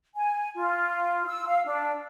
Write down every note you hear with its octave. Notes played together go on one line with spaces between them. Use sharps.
G#5
F4
E6
F5
D4